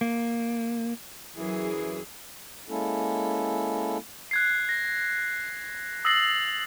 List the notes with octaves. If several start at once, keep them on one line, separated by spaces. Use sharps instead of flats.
A#3
F#2 E3 F#3 G#4
G#3 A#3 C#4 E4 A4
F#6 G#6 C7
A#6
D#6 E6 A6 A#6 C7 F#7